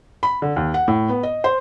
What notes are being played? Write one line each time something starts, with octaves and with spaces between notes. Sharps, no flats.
B5
D3
D#2
F#5
A2
B3
D#5
C5